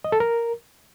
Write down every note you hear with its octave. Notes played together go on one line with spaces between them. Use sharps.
D#5
A4
A#4